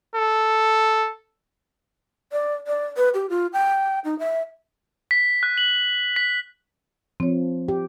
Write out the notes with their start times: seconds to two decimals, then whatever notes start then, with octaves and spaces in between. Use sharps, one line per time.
0.16 A4
2.32 D5
2.67 D5
2.97 B4
3.14 G4
3.30 F4
3.53 G5
4.05 D#4
4.19 E5
5.11 B6
5.43 F#6
5.58 F#7
6.16 B6
7.20 F3 C4 C#5
7.68 G4